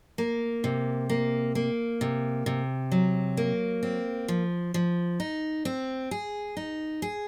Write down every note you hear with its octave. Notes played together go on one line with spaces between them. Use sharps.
A#3
C3
A#3
A#3
C3
C3
F#3
A#3
C4
F3
F3
D#4
C4
G#4
D#4
G#4